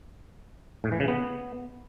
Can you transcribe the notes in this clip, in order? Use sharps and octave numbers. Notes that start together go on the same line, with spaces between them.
A2
E3
C#3
B3